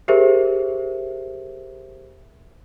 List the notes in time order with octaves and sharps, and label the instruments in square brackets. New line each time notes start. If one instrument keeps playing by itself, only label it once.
[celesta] G4 G#4 A#4 C5 E5